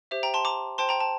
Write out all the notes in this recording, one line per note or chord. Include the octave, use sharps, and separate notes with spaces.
G4 C5 E5
G5 A#5
A5 C6
A#5 D6
C5 G5 A5 C6
G5 A#5
A5